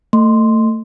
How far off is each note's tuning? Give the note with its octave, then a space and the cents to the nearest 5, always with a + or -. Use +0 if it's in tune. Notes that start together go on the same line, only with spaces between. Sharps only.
A3 +25 C6 +0